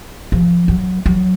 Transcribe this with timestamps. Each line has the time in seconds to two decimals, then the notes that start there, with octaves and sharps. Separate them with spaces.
0.32 F3
0.68 F#3
1.06 F#3